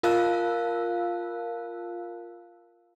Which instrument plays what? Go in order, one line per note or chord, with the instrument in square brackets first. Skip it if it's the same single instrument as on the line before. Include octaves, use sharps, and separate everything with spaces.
[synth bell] F4 A#4 F5 A5 E6 F#6